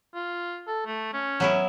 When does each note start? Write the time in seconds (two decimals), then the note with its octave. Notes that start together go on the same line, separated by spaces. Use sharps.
0.15 F4
0.67 A4
0.86 A3
1.13 C#4
1.40 F#3 B3 E4